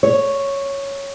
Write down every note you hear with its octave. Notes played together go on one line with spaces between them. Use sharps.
C#5